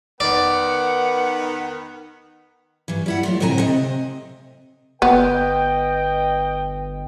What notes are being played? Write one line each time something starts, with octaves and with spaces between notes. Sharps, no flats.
D#3 B3 D5 F#5
G2 E3
G3 E4 F#5
F#3 A3 F4
D2 A2 C3 C4 G#5 A#5
C3 C4 D#5
G1 B3 B4 D#5 G5